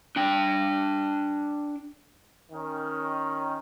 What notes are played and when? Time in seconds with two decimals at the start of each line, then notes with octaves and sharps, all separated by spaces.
0.16 D4 G5
2.52 D#3 C#4